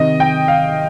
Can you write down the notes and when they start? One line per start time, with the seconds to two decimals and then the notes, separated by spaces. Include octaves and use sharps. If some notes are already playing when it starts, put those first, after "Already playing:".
Already playing: C3 D#3 D#5
0.20 G5
0.48 F5